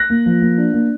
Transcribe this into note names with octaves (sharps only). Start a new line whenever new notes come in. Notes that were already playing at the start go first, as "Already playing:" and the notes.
Already playing: F#6 A#6
A#3
F3
A#3
D4
A#3